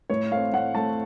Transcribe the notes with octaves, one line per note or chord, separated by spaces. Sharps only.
A2 C#5
A3 C4 F5
A2 F#5
A3 C4 A5